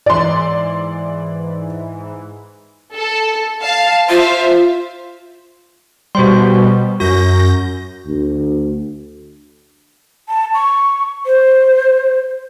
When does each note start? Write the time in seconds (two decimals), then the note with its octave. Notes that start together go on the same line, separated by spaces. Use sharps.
0.06 G#2 E3 D5 C6
2.96 A4
3.61 F5 A5
4.09 F4 C5 E5 F5
6.15 B2 G3 F#4 C5 C6
7.00 F#2 F#4 G6 A#6
8.07 D2
10.29 A5
10.54 C#6
11.26 C5